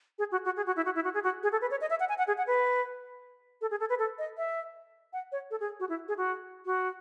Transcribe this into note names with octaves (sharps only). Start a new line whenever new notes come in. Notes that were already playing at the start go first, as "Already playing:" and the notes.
G#4
F#4
F#4
G#4
F#4
E4
F#4
E4
F#4
G#4
F#4
G#4
A4
B4
C#5
D#5
E5
F#5
G#5
F#5
G#4
F#5
B4
A4
G#4
A4
B4
A4
D#5
E5
F#5
C#5
A4
G#4
F#4
E4
G#4
F#4
F#4